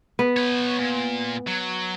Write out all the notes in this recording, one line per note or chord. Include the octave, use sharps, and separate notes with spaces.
B3
B4 C#5
A#2
F#3